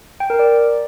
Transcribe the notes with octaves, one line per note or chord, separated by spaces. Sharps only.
G5
A#4
D5